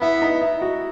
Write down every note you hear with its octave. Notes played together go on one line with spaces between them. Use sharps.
B3 E4
D#4
E4
F#4